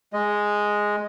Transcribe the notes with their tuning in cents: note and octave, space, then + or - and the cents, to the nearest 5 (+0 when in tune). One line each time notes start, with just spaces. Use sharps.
G#3 +0 D#5 +0